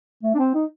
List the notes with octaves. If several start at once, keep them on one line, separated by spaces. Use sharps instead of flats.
A3
D4
C4
D#4